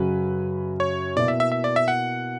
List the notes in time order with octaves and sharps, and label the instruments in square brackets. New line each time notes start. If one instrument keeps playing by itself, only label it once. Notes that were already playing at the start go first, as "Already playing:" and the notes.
Already playing: [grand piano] F#2 C#3 F#3 C#4 F#4 [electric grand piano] B4
[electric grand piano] C#5
[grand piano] B2 A#3 E4 [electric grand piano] D5
[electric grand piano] E5
E5
E5
D5
E5
F#5